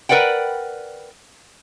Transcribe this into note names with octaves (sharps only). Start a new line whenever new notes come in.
A#4 B4 D5 F#5 G5